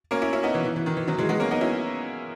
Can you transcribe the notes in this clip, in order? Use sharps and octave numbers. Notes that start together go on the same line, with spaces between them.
A#3 C#4
C#4 E4
C#4 E4
B3 D#4
E3
E3
E3
D#3
E3
D#3 F#3
E3 G#3
G#3 B3
A#3 C#4
B3 D#4
C#4 E4